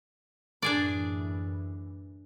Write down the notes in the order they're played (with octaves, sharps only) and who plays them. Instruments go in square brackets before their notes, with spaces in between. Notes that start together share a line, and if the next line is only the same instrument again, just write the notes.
[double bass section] F#2 A2 E3 [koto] D4 G#4 D5